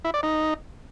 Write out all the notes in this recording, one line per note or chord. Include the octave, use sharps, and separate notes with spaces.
E4
D5
D#4